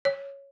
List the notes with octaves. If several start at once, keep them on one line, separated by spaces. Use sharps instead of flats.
C#5